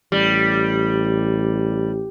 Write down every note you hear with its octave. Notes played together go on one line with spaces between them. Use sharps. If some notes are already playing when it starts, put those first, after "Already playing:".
A1 G3